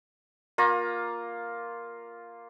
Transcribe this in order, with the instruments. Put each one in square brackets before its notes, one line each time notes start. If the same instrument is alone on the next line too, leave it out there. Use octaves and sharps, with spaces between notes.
[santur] A#3 F4 A#5